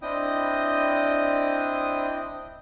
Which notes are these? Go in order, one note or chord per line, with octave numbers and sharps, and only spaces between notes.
C4 D4 E4 D#5 G5 D#6